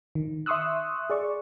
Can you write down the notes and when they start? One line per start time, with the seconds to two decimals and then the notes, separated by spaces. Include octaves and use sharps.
0.15 D#3
0.46 E5 C6 C#6 D#6 E6 F#6
1.10 G#4 D5 C#6